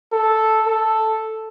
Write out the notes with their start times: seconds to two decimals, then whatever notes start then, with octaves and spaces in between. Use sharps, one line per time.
0.12 A4
0.67 A4